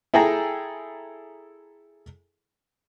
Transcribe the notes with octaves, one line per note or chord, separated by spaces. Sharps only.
E4 G#4 A4 G5 G#5 A#5